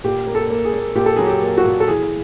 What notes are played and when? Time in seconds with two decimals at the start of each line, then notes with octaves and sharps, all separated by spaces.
0.04 A#2 G4
0.27 A#3
0.35 A4
0.50 A#3
0.65 G#4
0.73 A#3
0.95 A#2 G4
1.06 A4
1.17 F#3 G#4
1.26 G4
1.41 A#3
1.57 F#4
1.65 A#2
1.80 A4
1.88 E3 G#4